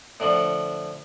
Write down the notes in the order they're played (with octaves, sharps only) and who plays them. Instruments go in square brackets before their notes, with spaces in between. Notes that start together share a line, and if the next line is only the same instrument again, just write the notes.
[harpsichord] A2 D3 F3